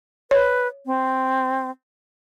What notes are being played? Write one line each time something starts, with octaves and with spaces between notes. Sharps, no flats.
B4 C#5
C4